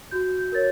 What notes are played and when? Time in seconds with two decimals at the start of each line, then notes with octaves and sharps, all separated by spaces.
0.11 F#4 G6
0.39 G6
0.52 A#4 C#5 A6